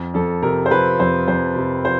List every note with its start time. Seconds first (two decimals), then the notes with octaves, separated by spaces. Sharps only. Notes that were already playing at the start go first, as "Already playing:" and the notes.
Already playing: F2
0.14 F2 A4
0.43 C3 A#4
0.66 C5
0.71 F3 B4
0.99 F2 C5
1.27 F2 C5
1.56 C3
1.84 F3 C5